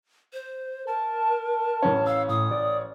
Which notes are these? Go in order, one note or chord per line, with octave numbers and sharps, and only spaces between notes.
C5
A#4 A5
A1 C#4
F5 E6
A2 D#6
D5